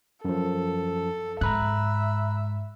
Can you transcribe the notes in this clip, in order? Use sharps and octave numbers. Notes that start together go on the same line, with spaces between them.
F#2 F3 A4
G#2 E5 A#5 B5 F#6